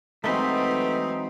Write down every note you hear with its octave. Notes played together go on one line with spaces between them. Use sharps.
E3 F#3 G#3 A3 C4 D#4 B4